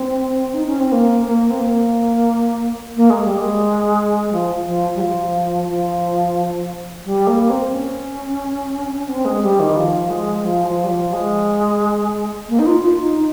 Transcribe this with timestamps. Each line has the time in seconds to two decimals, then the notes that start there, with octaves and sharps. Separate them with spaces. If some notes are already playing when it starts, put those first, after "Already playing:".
Already playing: C4
0.54 D#4
0.67 C#4
0.80 C4
0.92 A#3
1.26 A#3
1.50 C4
1.60 A#3
2.96 A#3
3.10 G#3
3.24 G3
3.38 G#3
4.33 F3
4.66 F3
4.95 G3
5.01 F3
5.68 F3
7.05 G3
7.27 A#3
7.50 C4
7.72 C#4
9.09 C4
9.25 G#3
9.43 G3
9.60 D#3
9.77 F3
10.10 G#3
10.45 F3
10.68 F3
10.84 G3
10.90 F3
11.13 G#3
12.49 A#3
12.59 D#4
12.66 F4
12.83 F4
13.00 D#4
13.17 D#4